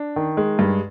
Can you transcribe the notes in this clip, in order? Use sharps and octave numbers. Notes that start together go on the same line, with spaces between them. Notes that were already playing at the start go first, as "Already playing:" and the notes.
Already playing: D4
D#3
G#3
G2